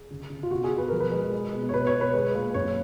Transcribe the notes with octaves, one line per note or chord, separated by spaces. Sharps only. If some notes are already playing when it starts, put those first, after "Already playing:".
Already playing: G#4
C#3
C#3
F4
B2 F#4
G#4
B2
B4
F3 A#4
B4
G#3
G#3
B2
C#5
B2 B4
C#5
B2
B4
G#3
A#2
F#2 C#5